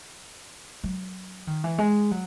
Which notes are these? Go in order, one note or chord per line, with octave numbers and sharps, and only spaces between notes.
F#3
D#3
E3
G#3
F#3